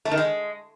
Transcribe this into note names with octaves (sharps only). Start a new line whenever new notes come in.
A3
D#3
G#3